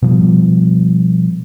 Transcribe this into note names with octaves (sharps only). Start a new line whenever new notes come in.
B2 F3 G3